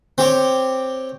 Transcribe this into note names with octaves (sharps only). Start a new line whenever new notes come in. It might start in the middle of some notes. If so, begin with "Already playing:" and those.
C4 G4 C#5